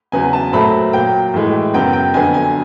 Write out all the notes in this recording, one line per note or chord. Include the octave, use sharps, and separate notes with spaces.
E2 C#3 F#3 B3 G#5
A5
A#2 F#3 A3 C4 B5
A#2 F#3 A#3 G5
A2 E3 G#3
F#2 C#3 F#3 B3 G5
G5
F2 D3 F#3 B3 G#5
G#5